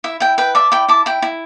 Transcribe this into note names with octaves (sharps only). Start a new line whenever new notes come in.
E4 E5
E4 G5
B4 G5
D5 E5 A5
E4 G5 B5
E4 A5 D6
E4 G5
E4